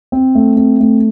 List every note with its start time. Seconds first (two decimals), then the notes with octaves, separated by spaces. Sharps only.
0.12 C4
0.35 A3
0.57 C4
0.80 A3